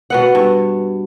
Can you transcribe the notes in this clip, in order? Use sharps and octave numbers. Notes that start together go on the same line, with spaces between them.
B2 B3 F#5
G2